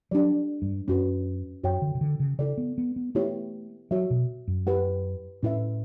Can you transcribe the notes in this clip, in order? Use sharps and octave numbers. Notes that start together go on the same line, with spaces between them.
F#3 D4 G4 D5
G2
F#2 C#4 F#4 B4
F#2 F#4 C#5 G5
D3
C#3
D3
C#3
C#3 E4 A4 D5
B3
B3
B3
A3 B3 E4 G4 C#5
F#3 F#4 C#5 E5
B2
F#2
E4 G4 B4 F#5
A2 C#4 E4 B4 E5